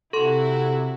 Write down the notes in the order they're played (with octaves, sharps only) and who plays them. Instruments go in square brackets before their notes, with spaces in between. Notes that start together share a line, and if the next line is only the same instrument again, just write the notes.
[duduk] C3 [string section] C4 E4 F#4 [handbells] A4 C6